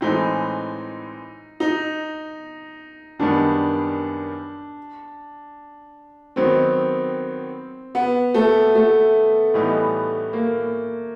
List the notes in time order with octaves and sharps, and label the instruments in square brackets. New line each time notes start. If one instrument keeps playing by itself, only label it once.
[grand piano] A2 E3 G#3 C4 [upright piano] D#4
[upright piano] D#4
[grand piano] F#2 D#3 G3 B3 [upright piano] D4
[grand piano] D#3 F#3 B3 [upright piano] C4
[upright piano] B3
A3
A3
[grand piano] A2 E3 G3 B3 D#4
[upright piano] A#3